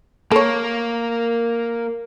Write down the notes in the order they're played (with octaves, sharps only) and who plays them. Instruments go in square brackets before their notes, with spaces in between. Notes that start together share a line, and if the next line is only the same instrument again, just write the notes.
[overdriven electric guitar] A#3 [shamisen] A4 C#5